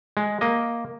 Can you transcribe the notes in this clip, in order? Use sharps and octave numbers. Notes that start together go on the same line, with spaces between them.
G#3
A#3 D#5